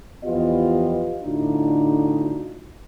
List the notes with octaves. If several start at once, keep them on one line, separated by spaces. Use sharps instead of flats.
E2 F3 B3 F4 G4 D#5
A2 D3 D4 D#4 F4 F#4